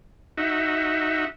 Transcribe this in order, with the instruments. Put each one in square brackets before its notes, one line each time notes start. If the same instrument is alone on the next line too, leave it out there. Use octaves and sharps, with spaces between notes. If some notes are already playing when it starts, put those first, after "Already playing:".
[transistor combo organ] D#4 F#4 E5